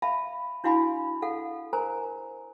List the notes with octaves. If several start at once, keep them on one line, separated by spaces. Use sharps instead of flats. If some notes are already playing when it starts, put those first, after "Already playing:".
E5 F5 A5 B5
D4 E4 F#4 F5 G#5 B5
A4 F5 F#5
A#4 C5 G#5 A#5